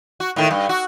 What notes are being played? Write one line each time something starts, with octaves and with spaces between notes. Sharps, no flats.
F#4
A2 D#3
G2
F#4